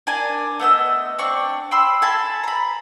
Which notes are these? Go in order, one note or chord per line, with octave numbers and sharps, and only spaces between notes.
D4 A#4 G#5
A3 B3 D#5 E6
C4 D4 C#6
G5 B5 C6 E6
A4 G#5 A5 B5
A#5 B5